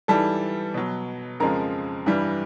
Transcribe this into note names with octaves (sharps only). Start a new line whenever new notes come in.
G#2 E3 G3 A4 A5
B2 F#3
F2 C#3 F3 G#3 A#4 A#5
G2 E3 G3